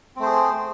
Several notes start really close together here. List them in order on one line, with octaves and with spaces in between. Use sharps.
C4 A3 C5 G#4